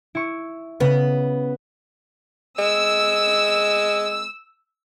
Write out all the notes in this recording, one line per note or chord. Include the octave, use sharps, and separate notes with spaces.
E4 C#6
C#3 B3
G#3 E6